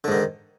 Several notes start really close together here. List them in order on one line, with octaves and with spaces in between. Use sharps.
D3 G#2 D#3